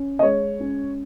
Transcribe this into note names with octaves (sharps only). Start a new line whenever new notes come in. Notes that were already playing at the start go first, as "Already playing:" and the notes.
Already playing: C#4
D#5
G#3 C#5
C#4